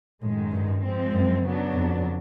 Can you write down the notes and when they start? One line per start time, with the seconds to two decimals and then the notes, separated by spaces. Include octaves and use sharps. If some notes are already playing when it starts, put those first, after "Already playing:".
0.22 F#2 A2 D#3 G#3
0.51 G2
0.82 F3 G#3 C4
1.12 F#2
1.43 C#3 F#3 B3 D4
1.73 F2